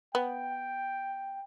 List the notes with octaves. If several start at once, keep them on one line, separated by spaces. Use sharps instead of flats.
B3 G5